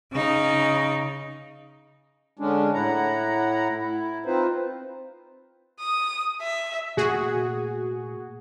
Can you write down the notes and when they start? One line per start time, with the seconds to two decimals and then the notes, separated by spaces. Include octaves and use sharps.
0.12 C#3 D#4
2.39 D3 G#3 C#4 D4
2.74 A2 E4 F#5 A#5
3.80 E4
4.26 C4 D#4 F4 B4 C5
5.80 D#6
6.42 E5
6.97 A#2 A3 F#4 G#4